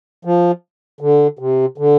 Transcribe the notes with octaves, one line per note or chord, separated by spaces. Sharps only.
F3
D3
C3
D3